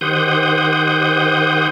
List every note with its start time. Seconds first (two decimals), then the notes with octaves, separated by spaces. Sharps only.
0.01 D#3 G4 C5 F#5 D#6 G6